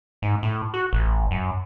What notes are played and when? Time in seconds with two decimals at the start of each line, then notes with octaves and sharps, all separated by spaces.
0.22 G#2
0.43 A2
0.74 F#4
0.93 A1
1.31 F#2